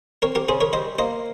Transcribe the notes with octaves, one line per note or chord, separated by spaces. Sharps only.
C4 A#4 C#5
G4 A#4
C#3 G#4 C5
A#4 C#5
G3 C5 D#5
A#3 C5 D#5